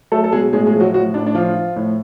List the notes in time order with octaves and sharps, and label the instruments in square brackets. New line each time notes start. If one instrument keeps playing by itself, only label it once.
[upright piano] F#3 A3 A4
A4
B2 G#3 G#4
A2 G#3 G#4
G#3 G#4
F3
F#3 F#4
A2 F#3 F#4
A2 D4
D4
F3 F4
F3
A2